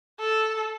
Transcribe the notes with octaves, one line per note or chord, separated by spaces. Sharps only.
A4